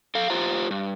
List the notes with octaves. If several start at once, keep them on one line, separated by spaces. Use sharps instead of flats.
A4 F5
F4 G4 C5 A#5
G2